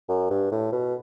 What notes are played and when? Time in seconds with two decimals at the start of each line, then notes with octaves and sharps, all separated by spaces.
0.08 F#2
0.30 G2
0.51 A2
0.72 B2